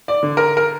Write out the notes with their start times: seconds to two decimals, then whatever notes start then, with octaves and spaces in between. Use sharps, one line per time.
0.08 D5
0.23 D3
0.37 A#4
0.57 A#4